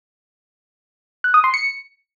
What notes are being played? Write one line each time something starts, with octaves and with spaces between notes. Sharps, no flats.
F#6
D#6
C6
C#7